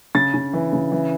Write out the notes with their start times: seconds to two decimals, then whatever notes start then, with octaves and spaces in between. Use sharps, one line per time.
0.15 C#3 A6
0.34 C#3
0.53 E3
0.73 C#3
0.92 E3